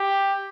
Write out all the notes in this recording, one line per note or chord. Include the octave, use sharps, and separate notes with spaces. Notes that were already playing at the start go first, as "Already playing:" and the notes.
Already playing: G4